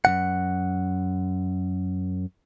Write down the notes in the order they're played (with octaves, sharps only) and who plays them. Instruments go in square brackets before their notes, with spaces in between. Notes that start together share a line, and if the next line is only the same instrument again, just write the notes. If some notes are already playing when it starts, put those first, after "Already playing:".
[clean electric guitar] F#2 C#3 F#5